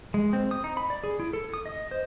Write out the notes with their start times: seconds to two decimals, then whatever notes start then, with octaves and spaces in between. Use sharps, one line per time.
0.14 G#3
0.33 C4
0.51 D#6
0.64 D#4
0.77 B5
0.90 D5
1.04 G#4
1.20 E4
1.33 A4
1.54 D#6
1.66 D#5
1.91 C5